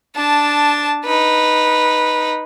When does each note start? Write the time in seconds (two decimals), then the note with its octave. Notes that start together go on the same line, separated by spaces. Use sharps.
0.16 D4 A5
1.05 D#4 B4